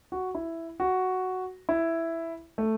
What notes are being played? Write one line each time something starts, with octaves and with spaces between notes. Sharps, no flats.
F#4
E4
F#4
E4
A3